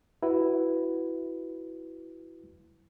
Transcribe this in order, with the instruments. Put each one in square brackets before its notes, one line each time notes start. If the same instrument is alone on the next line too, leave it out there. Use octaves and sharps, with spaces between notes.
[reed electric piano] E4 F#4 B4